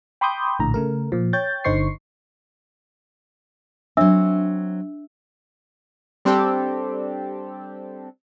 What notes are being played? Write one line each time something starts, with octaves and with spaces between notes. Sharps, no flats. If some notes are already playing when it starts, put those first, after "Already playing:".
G5 B5 C6 D6 D#6 G6
A#1 A2 D3 A#5
C#3 A3 A#4
A#2 F3
C#5 G5 G6 A6
G1 D3 D#4 C5 C#6 C7
F#3 C4 D4 E5 E6
G3 C4 D4 G4 A4